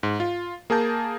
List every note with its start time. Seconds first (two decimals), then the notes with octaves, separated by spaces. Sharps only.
0.03 G#2
0.20 F4
0.70 A#3 G#4 A#4 A5 G6